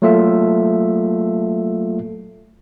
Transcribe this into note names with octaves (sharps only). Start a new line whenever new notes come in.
F#3 A3 A#3 F4 A4 E5